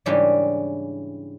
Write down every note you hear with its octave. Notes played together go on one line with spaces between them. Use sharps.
G#2 C#3 E3 G3 C#4 D4